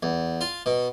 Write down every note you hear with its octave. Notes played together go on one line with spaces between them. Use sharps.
E2
F4
B2